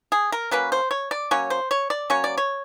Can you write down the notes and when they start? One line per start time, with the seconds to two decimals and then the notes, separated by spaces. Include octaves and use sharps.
0.12 G#4
0.32 A#4
0.51 F#3 A#3 C#4 B4
0.72 C5
0.91 C#5
1.11 D5
1.31 F#3 A#3 C#4 C#5
1.50 C5
1.71 C#5
1.90 D5
2.10 F#3 A#3 C#4 C#5
2.24 D5
2.37 C#5